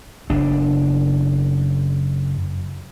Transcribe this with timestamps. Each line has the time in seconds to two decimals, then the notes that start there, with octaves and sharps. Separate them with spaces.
0.30 F#1 D4